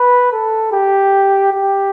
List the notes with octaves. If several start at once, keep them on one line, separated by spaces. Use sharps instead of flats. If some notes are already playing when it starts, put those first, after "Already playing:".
Already playing: B4
A4
G4
G4